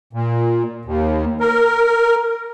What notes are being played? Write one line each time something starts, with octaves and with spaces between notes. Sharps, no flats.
A#2
D#2
A#4